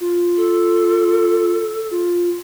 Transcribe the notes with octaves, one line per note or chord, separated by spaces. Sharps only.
F4
A4
F4